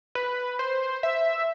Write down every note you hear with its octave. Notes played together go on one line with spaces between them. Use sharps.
B4
C5
E5